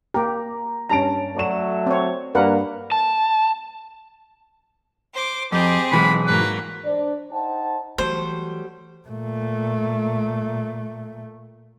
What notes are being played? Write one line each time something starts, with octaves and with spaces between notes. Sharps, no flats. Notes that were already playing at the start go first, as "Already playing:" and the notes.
A#3 G4 A#5
G2 C#4 A5 A#5 D7
F#3 A3 D5 C#6 E7
C4 C#5
G2 A#3 A#4 B4 D5 F5 F#5
A5
C5 D6
F2 C4 G4 G#4
B1 E3 G#3 B5
G#2 F#3 A#3 B4
D4 C5 D5
D#4 C5 F#5 G5 A5
E3 F#3 G3 A3 C5
A#2 A3